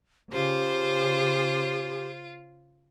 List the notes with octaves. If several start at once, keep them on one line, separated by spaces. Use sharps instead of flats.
C#3 F4 G4 C5